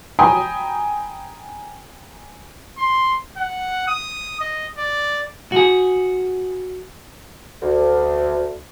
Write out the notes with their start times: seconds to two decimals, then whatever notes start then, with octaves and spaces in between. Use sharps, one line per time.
0.19 G5 G#5 A#5 B5 D#6
2.78 C6
3.37 F#5
3.88 D#6
4.41 D#5
4.78 D5
5.52 F#4 G#4
7.62 D2